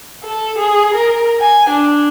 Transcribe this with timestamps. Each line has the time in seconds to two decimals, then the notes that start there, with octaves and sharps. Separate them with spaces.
0.24 A4
0.59 G#4
0.95 A#4
1.40 G#5
1.69 D4